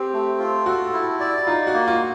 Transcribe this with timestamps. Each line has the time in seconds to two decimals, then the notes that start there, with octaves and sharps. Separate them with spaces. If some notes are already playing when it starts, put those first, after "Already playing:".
Already playing: C4 G4
0.13 A3
0.39 F4
0.66 F#4 A4
0.93 E4
1.20 D5
1.47 D#4 F4
1.67 F#4
1.74 A#3
1.88 F4